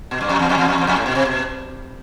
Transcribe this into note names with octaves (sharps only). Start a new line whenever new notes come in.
B2
G2
F2
E2
F2
E2
F2
E2
F2
A2
B2
C3
B2